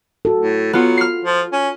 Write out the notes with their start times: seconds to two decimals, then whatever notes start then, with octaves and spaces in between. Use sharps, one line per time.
0.25 F#4 A4
0.39 A2
0.73 F#3 B3 F4
0.97 F6 C7
1.25 F3
1.52 C#4